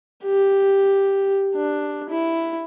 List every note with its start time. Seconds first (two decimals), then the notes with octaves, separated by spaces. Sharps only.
0.24 G4
1.55 D4
2.09 E4